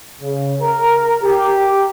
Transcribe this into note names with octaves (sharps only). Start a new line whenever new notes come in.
C#3
A#4
G4